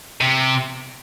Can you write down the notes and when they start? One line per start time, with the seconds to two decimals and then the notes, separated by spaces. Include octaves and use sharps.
0.21 C3